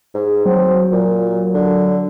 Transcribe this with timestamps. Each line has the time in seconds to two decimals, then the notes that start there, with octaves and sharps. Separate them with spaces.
0.14 G#2
0.45 F#3 C4
0.92 A#2
1.54 D3